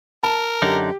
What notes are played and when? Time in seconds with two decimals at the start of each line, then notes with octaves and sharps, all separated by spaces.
0.23 A#4 A5
0.62 F#2 D3 D#4 G4